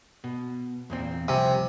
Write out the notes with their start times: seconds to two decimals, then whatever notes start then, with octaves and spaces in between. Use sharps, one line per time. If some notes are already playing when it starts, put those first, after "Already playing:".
0.24 B2
0.90 E2 A#2 C4
1.28 C2 C3 F3 G#5